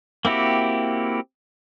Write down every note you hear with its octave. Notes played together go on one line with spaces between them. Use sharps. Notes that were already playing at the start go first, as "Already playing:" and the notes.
A#3 C4 E4 F#4 G4